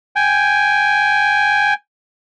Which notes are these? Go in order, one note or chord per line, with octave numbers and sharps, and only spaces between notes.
G5 G#5